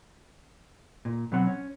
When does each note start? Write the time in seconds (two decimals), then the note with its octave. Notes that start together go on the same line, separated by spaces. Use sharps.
1.05 A#2
1.32 B2 F#3 B3 C4 F#5
1.47 C#4